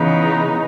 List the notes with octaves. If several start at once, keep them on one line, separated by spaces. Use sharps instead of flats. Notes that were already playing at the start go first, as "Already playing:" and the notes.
Already playing: C#3 E3 B3 D#4